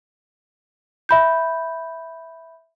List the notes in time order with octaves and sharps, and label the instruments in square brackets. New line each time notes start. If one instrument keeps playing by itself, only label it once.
[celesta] E5 B5 G6